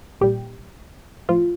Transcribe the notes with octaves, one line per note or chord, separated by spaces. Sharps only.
A#1 A#2 G3 G4
A2 F3 F4